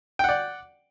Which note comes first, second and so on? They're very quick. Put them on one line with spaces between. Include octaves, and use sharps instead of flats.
G5 F#5 D5